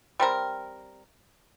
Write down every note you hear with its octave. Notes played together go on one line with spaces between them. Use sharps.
G3 C4 A#4